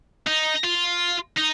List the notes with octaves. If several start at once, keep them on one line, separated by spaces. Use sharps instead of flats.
D#4
F4
D#4